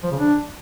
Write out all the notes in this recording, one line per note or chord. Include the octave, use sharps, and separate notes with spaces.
F3
C#3
D4